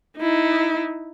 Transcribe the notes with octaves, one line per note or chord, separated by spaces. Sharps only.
D#4 E4